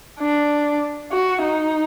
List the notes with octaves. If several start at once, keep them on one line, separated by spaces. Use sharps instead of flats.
D4
F#4
D#4